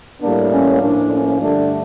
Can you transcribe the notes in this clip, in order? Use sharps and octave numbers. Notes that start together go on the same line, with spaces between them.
A2 G3 A#3 D4
C#4
A2 F3 A#3 D4
C#4
G2 D3 A3 D4